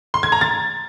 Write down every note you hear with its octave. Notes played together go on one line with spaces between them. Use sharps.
C6
G#6
A#5
A6